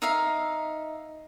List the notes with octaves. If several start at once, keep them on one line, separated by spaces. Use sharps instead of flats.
D#4 E5 F5